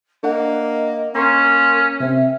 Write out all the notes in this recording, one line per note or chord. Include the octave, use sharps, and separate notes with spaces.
A#3 D4 D#5 F#5
A#3 C#4 A#4 A#5 C6 C#6
C3 C4 E5